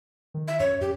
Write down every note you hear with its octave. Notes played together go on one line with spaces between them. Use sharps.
D#3
E5
F#2 C#5
F#2 G4